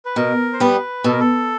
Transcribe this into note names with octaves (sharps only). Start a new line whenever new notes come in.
B4
B2 A#4
C5
G3 B3 B4
B2 A4
A#4
A4